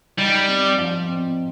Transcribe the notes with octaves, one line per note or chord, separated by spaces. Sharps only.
G3 D#4
C4
F3
C4